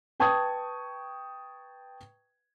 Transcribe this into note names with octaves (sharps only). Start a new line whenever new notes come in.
B4 G5 A5 C#6 D#6 G#6